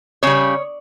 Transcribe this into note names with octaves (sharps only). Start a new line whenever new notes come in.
C#3 G3 C#5